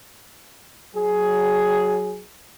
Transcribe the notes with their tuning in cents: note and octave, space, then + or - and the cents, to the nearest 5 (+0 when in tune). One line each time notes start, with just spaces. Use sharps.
F#3 +0 G#4 +10